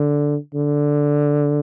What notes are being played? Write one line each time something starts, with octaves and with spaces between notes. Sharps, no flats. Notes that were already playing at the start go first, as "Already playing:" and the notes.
Already playing: D3
D3